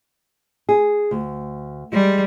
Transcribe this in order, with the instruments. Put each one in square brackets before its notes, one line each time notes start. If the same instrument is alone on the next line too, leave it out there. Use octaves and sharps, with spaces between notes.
[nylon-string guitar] G#4
D2
[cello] G3 [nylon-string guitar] G#3